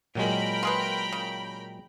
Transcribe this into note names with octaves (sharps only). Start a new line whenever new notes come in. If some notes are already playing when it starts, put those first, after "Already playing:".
A#2 F#3 G#3 A#4 G5 B5
F4 G#4 B4
C#3